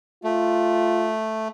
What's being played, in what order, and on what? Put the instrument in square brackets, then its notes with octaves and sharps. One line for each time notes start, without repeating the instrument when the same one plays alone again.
[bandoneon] A3 [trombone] F4